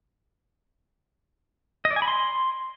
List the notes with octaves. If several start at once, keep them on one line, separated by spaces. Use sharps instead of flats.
D#5
D5
G#5
B5
C6